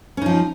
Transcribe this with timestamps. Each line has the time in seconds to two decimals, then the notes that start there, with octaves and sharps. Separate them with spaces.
0.17 C#4
0.22 D#4
0.26 F3